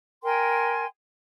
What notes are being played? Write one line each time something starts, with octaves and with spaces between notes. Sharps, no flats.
A#4 G5 G#5 C6